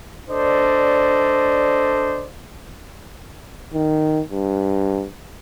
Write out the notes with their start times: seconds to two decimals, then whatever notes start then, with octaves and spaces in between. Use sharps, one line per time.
0.29 D4 A4 C5 D5 D#5
3.74 D#3
4.32 G2